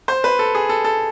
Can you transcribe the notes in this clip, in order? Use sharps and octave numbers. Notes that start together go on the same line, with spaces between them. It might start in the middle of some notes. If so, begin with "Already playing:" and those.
C5
B4
A4
G#4
A4
A4